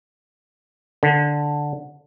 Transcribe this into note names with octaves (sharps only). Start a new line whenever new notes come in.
D3